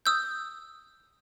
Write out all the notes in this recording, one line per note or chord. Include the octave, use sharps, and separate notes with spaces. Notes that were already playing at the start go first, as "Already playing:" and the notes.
D#6 E6 G6